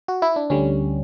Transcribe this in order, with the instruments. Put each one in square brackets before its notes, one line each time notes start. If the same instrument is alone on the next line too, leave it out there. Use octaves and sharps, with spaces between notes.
[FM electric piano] F#4
E4
D4
D2 D3 G3 C#4